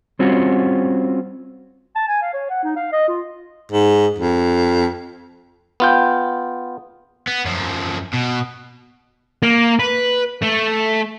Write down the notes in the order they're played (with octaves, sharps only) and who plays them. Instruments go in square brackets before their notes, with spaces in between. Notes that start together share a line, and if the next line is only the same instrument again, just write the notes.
[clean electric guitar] G3 C4 C#4 F4 F#4
[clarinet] A5
G#5
F5
C#5
F#5
D#4
F5
D#5
F4
[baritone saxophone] G#2
F2
[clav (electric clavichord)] B3 F4 G5
[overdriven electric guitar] B3
F#2 F3
B2
[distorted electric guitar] A#3
B4
A3